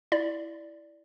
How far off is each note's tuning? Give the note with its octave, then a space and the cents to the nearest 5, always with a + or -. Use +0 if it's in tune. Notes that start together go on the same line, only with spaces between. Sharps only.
E4 +0 D5 +0